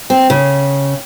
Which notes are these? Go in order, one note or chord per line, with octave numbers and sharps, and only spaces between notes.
C4
C#3